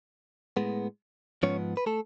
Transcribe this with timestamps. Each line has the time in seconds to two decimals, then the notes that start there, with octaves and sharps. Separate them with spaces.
0.57 A2 G#3 B3
1.43 G#2 F3 B3 C#4 C#5
1.77 B4
1.86 A3 A4